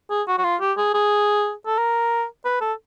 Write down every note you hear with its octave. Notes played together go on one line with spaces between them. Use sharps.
G#4
F#4
F#4
F4
G4
G#4
G#4
A4
A#4
B4
A4